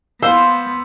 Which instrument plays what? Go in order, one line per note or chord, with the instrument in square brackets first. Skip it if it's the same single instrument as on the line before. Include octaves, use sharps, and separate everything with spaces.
[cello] B3 [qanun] C5 [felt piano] F5 E6